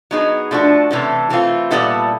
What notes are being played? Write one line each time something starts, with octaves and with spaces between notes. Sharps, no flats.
F#3 B3 D#4 G#4
F3 A3 D4 F#4
C3 E3 A3 C#4
E3 A3 C4 F4
A#2 G3 B3 E4 A4